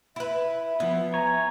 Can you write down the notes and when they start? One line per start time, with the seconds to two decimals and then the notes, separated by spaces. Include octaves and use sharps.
0.16 E4 B4 E5
0.80 F3 B3 E4
1.14 C#5 G#5 A#5